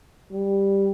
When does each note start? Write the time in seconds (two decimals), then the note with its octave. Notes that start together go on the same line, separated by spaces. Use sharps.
0.32 G3